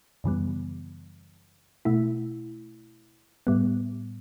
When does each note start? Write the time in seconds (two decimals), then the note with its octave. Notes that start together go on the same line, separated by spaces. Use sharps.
0.24 F#2 C#3 E3 G3 B3
1.85 B2 A3 E4
3.47 A2 G3 B3